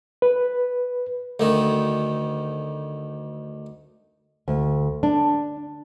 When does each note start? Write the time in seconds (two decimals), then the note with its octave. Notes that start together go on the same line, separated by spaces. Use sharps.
0.22 B4
1.40 D2 D#3
4.48 D2
5.03 D4